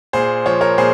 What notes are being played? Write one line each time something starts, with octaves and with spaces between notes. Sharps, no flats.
A#2 G#4 C5
F3 C#5
A#4 C#5
A#2 G#4 C5